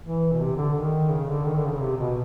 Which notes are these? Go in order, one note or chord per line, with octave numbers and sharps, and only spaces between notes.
E3
B2
C3
D3
D#3
C#3
D3
D#3
D3
C#3
C3
B2